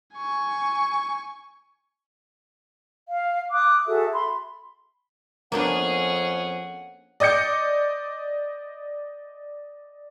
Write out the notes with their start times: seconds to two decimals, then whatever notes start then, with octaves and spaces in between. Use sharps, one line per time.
0.15 G#5 C#6
3.09 F5
3.51 D6 D#6 F#6
3.86 F#4 G#4 A4 E5
4.12 B5 C6
5.52 F2 A#3 B3 C#4 D4 G#4 F#5
7.20 D5 D#5 D6 G6 C#7